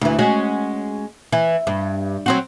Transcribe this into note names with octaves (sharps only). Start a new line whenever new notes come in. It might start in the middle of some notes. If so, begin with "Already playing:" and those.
D2 E3
G#3 C#4 F#4
E3
G2
F#3 C4 F#4